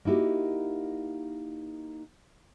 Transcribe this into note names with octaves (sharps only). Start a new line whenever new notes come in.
A#3 D#4 E4 F#4 G4